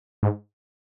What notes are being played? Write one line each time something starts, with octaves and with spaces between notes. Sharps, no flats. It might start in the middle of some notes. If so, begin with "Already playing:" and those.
G#2